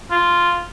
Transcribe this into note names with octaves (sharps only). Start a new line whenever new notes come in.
F4